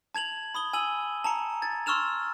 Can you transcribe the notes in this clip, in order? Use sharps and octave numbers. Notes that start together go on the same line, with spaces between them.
A5 G#6 F7 F#7
B5 D#6 G7
G#5 E6 D#7 F#7
A5 A#5 C#7
G#6 A6
C6 C#6 E6 F6 E7 F7